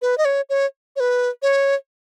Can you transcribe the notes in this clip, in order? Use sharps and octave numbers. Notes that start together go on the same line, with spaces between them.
B4
D#5
C#5
C#5
C#5
B4
C#5